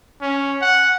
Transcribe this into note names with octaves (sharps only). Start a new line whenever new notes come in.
C#4
F#5